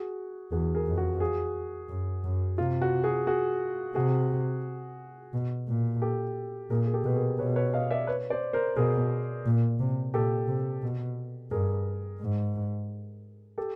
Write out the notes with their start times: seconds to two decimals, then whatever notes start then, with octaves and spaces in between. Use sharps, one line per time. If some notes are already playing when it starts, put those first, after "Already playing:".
Already playing: F#4 G#4
0.52 E2 F#4 G#4
0.74 G#4 A#4
0.86 F2
0.98 F#4 G#4
1.20 F#4 G#4
1.89 F#2
2.24 F#2
2.58 C3 F4
2.82 F#4
3.04 F#4 G#4
3.27 F#4 G#4
3.95 C3 F#4 G#4
5.33 B2
5.68 A#2
6.02 G4 A4
6.70 A#2 G#4 A#4
6.86 G#4
6.93 G4 A4
7.04 B2 B4
7.16 G#4 A#4
7.39 B2 B4 C#5
7.56 B4 C#5
7.74 D#5 F5
7.91 D5 E5
8.07 B4 C#5
8.30 C5 D5
8.53 A#4 C5
8.76 B2 G#4 A#4
9.46 A#2
9.80 C3
10.14 A#2 G4 A4
10.48 C3
10.83 B2
11.51 G2 G#4 A#4
12.21 G#2
13.58 G4 A4